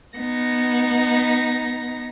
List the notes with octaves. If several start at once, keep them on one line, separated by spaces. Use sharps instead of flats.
B3 D#4 A#6